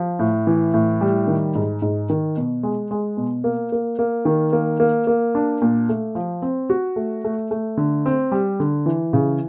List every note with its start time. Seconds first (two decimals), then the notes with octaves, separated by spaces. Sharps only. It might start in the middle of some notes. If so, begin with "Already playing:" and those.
Already playing: F3
0.19 A2
0.47 E3
0.74 A2
1.01 G3
1.27 D#3
1.55 G#2
1.82 G#2
2.09 D#3
2.37 B2
2.63 G#3
2.91 G#3
3.17 B2
3.44 A#3
3.72 A#3
3.99 A#3
4.25 D#3
4.53 A#3
4.80 A#3
5.07 A#3
5.35 D4
5.62 A#2
5.89 A3
6.15 F3
6.42 C4
6.70 F#4
6.96 A3
7.24 A3
7.51 A3
7.77 D3
8.06 C4
8.32 G3
8.60 D3
8.86 E3
9.13 C#3